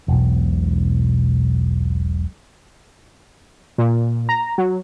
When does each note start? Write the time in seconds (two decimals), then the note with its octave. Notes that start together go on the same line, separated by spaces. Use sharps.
0.08 E1 B1
3.78 A#2
4.29 A#5
4.58 F#3